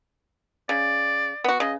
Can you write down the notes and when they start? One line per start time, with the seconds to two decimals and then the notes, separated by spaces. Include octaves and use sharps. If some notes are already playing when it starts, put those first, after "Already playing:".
0.69 C#3 D5
1.44 B3 F#4
1.60 C#3 D#5